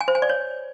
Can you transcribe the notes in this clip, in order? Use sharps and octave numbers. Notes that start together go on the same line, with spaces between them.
G#5
C5
G#5
D5
C#5